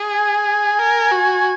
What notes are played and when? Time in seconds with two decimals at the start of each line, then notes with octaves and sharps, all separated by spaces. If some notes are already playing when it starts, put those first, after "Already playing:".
Already playing: G#4
0.13 G#5
0.79 A#4
1.12 F#4